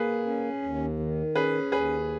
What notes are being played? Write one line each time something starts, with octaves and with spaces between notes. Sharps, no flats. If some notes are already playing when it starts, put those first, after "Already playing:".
Already playing: A#3 G#4 B4
C#4
D#2
D#3
C#4 G#4 B4
D#2 G#4 B4